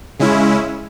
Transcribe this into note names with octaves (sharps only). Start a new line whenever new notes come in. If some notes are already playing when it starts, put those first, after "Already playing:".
C#3 G#3 C#4 E4